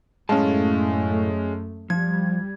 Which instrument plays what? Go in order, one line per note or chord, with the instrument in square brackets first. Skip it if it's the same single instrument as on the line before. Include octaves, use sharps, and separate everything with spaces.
[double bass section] F#2 A3 [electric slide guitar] A2 F5 A5 [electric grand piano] G#3 C#4
[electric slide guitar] F3 [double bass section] G3 [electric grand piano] G#6